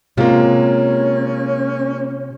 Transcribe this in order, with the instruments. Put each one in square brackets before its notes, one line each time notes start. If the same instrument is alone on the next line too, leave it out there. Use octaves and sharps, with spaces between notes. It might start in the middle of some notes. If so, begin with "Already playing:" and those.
[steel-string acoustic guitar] C3 [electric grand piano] G#3 A#3 [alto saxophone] C#4 [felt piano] F4